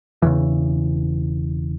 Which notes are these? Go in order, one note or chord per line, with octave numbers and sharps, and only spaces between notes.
E1 E2 C#3 E3